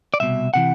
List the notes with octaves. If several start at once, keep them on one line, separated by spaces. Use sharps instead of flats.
D5
C2 B2 E5
C3 E3 F#5